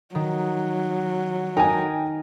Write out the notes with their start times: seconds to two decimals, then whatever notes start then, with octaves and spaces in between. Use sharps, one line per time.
0.15 D#3 F#3
1.57 D#4 A#4 G5 G#5